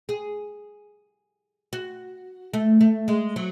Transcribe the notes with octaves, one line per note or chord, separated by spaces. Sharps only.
G#4
F#4
A3
A3
G#3
F#3